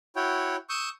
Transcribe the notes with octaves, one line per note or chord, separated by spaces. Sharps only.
E4 F#4 C#5 G5
C#6 D#6 E6 G6